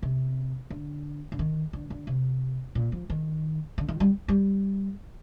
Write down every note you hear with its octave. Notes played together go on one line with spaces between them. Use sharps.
C3
D3
D3
D#3
D3
D3
C3
A#2
F3
D#3
D3
D#3
G3
G3